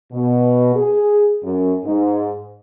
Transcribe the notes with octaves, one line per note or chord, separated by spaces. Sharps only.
B2
G#4
F#2
G#2